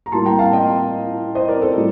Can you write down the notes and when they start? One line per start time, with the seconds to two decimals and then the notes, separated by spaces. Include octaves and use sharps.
0.06 A#5
0.12 A2 G3 A#3 A5 C6
0.26 G5 A#5
0.39 F5 A5
0.53 D#5 G5
1.35 C5 D#5
1.48 A#4 D5
1.62 A4 C5
1.76 A2 G3